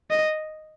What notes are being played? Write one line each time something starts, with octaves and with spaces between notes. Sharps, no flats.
D#5